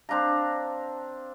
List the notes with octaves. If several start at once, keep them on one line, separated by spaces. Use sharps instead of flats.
C4 D4 F5 A#5